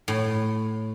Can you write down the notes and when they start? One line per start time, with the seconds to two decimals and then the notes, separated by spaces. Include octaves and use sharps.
0.08 A2